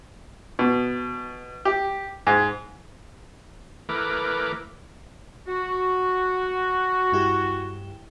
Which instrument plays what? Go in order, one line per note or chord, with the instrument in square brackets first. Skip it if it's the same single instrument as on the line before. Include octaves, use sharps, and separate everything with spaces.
[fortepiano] B2
G4
G#2
[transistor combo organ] E3 A3 A#4 B4 D6
[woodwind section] F#4
[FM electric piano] G2 E4 G4